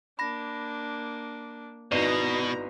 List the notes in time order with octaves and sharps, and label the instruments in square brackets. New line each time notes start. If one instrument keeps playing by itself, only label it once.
[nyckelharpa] A#3 D4 [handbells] B5 A#6
[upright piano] G#1 B3 D#4 [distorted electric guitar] B2 [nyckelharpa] E4 A#5 [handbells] F#4 D5